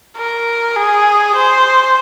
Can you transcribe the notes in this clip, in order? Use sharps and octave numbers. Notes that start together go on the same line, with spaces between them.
A#4
G#4
C5